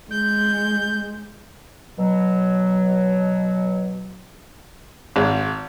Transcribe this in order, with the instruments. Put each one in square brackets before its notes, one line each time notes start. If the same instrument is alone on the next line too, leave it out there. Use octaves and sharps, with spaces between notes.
[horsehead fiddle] G#3 [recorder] G6
[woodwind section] B2 F#3
[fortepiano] G#1